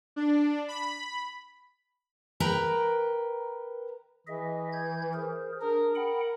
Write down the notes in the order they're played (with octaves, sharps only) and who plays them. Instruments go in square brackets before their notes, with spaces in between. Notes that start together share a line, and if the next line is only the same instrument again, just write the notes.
[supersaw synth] D4
B5
[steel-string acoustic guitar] A#4 B4 G5 A#5
[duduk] E3 [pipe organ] G#4 D#5 E5
[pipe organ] G6 G#6
G#4 A#4 C5
[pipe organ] D4 G#4 [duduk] A#4
[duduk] A#4 [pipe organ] F#5 G5 B5